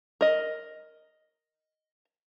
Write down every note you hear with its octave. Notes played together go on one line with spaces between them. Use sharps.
A#4 D#5